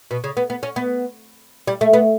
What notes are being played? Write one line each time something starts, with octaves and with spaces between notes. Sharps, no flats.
B2
C#3
B3
B3
C#4
B3
G3
A3
B3